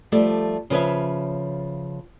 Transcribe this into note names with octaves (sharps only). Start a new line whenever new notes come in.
F3 G3 A3 G4 A4 D5
C#3 F3 B4 C#5 E5